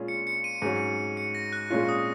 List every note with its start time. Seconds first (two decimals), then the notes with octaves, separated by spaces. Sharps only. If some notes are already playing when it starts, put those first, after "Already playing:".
Already playing: A#2 G#3 C#4 F4
0.08 C#7
0.27 C#7
0.44 D#7
0.62 G#2 F#3 C#4
1.17 C#7
1.35 A#6
1.53 F#6
1.70 A#2 G#3 C#4 F4 F#6
1.89 D#6